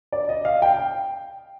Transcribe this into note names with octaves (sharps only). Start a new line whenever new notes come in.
D5
D#5
F5
G5